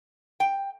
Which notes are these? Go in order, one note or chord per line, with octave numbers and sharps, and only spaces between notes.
G5